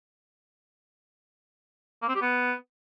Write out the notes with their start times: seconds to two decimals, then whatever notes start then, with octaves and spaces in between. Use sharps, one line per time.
2.02 A#3
2.08 C4
2.15 G4
2.21 B3